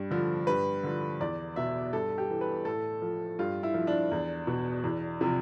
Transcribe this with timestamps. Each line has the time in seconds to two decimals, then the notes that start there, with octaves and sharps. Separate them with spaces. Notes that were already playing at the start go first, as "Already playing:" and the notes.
Already playing: G2
0.11 D3 F3
0.47 G2 B4
0.83 D3 F3
1.20 E2 D5
1.56 B2 E5
1.92 G2 A4
2.18 G4
2.30 E3
2.41 B4
2.65 A2 A4
3.02 F3
3.39 G2 F4
3.63 E4
3.74 F3
3.87 D4
4.11 E2
4.47 B2
4.84 E2
5.21 C3 F3